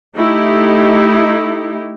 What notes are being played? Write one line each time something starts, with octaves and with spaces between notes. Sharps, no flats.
A3 D#4 E4 G4